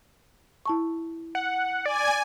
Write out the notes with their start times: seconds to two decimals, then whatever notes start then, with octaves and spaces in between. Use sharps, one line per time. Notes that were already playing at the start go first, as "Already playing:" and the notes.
0.66 E4 A5 C#6
1.35 F#5
1.86 D5 G#5